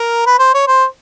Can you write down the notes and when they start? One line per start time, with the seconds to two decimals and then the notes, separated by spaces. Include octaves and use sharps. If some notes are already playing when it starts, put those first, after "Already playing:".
Already playing: A#4
0.26 B4
0.39 C5
0.54 C#5
0.67 C5